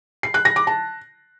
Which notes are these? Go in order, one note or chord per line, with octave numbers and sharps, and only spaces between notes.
C7
F#6
A#6
D6
A5